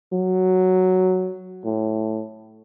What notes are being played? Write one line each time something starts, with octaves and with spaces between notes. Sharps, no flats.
F#3
A2